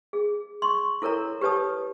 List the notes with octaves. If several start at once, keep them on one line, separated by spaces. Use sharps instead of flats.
G#4
C6 C#6
E4 A4 A#4 C#5 A#5
G4 B4 C#5 A5 D#6